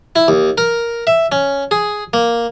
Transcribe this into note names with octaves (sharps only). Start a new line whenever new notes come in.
E4
D#2
A#4
E5
C#4
G#4
A#3